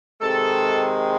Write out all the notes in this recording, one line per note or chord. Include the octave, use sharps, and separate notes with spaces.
C3 D#3 G#3 A4